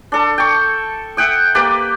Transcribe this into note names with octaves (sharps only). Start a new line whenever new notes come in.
D4 A4
G5 C#6
E5 F#5 G5 D#6
A#3 G4 B4 D5